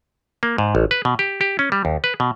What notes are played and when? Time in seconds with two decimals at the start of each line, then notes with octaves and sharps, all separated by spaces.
0.43 A#3
0.58 G#2
0.75 A1
0.91 B4
1.05 B2
1.19 G4
1.41 G4
1.59 C#4
1.72 G3
1.85 D#2
2.04 B4
2.20 B2